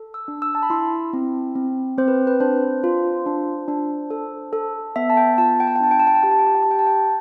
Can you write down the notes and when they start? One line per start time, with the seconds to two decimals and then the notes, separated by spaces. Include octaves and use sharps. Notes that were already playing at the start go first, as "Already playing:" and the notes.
Already playing: A4
0.14 E6
0.28 D4
0.42 E6
0.55 A5
0.63 B5
0.70 E4 C6
1.13 C4
1.55 C4
1.98 C4 C5
2.08 B4
2.27 B4
2.40 D4 C5
2.84 F4
3.26 D4
3.68 D4
4.10 A4
4.53 A4
4.96 B3 E5
5.10 A5
5.17 G5
5.38 F4 A5
5.60 G5
5.67 A5
5.76 G5
5.80 D4 A5
5.91 G5
6.00 A5
6.07 G5
6.15 A5
6.23 G4 G5
6.31 A5
6.39 G5
6.47 A5
6.55 G5
6.63 A5
6.66 G4 G5
6.79 A5
6.87 G5